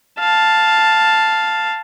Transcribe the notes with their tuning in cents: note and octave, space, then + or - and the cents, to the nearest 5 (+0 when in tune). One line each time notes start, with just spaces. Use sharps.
F5 +0 A5 +0